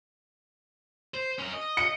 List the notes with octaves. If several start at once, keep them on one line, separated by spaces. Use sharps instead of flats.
C5
C#4 A#4
D#5
C#7